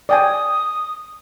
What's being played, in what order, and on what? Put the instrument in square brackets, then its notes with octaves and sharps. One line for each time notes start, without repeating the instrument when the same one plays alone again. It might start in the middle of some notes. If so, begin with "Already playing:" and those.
[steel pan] D5 G5 G#5 [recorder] D#6